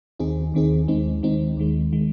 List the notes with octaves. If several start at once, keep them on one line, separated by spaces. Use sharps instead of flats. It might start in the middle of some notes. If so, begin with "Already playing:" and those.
D#2 D#3 C4 D#4 G#4
D#2 D#3 C4 D#4 G#4
D#2 D#3 G#3 C4 D#4
D#2 D#3 G#3 C4 D#4
D#2 D#3 G#3
D#3 G#3